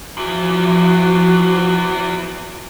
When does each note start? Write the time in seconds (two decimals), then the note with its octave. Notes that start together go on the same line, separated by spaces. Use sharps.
0.17 E2 E3 F3 F#4